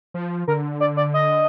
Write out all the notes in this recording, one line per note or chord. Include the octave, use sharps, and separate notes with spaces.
F3
D3 A#4
D5
D5
D#5